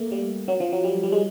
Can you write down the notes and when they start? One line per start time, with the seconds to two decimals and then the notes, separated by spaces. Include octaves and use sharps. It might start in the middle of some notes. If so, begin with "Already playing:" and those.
Already playing: A3 A#3
0.12 G3
0.48 F#3
0.60 F3
0.72 F#3
0.84 G3
1.03 G3
1.12 G#3